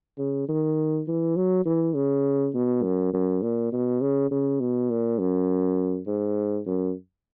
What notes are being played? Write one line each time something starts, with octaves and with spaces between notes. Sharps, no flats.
C#3
D#3
E3
F#3
E3
C#3
B2
F#2
F#2
A#2
B2
C#3
C#3
B2
A#2
F#2
G#2
F#2